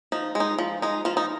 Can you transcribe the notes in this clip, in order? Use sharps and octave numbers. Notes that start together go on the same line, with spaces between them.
F3 D#4
G#3
D#4
F3
G#3 D#4
F3 F4
D#4